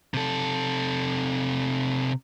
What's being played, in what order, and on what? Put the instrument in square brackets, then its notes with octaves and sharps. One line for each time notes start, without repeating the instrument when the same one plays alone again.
[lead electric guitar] C3 A4